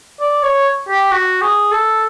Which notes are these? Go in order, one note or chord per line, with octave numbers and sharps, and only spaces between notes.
D5
C#5
G4
F#4
G#4
A4